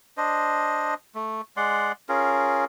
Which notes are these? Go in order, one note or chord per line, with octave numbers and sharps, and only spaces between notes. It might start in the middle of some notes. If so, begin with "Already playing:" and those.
D4 C5 D#5
A3
G#3 D5 F#5 C6
C#4 F4 G#4 A#4